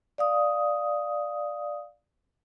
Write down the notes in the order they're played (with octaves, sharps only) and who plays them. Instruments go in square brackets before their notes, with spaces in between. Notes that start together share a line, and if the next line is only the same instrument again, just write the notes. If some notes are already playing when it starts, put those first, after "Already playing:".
[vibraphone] D5 F5 D#6